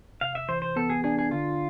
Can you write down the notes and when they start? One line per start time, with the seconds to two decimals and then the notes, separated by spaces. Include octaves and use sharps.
0.21 C3 F5
0.35 E5
0.49 E3 C5
0.62 C5
0.76 B3 A4
0.90 G#4
1.04 D4 G#4
1.19 G#4
1.31 D3 F4